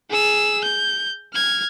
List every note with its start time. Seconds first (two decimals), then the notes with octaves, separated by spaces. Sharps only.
0.10 G#4 E6
0.64 G6
1.33 F6 G#6